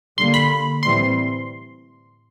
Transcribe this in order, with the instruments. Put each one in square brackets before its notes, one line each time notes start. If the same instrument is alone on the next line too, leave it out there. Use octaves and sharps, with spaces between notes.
[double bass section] D3 G3 A#3 [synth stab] C6
[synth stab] B5
[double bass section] A2 E3 G3 C4 [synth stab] C6